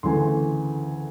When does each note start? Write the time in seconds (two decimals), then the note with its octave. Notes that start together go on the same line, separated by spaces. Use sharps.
0.03 D2 C#3 E3 A3 C6